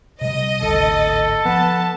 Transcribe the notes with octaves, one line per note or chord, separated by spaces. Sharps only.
C3 G3 D#5
D1 G#1 D2 A4
F3 B3 A5